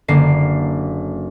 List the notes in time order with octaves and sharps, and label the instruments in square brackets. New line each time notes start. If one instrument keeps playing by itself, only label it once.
[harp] F#1 D3 A#3 C7